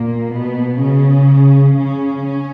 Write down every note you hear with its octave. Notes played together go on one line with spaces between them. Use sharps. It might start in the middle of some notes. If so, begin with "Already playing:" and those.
Already playing: A#2 A#3
B2 B3
C#3 C#4
C#3 C#4
C#4